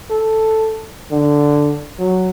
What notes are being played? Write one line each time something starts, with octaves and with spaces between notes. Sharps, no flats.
A4
D3
F#3